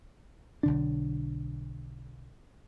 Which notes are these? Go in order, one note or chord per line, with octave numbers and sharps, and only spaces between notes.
B1 D3 D4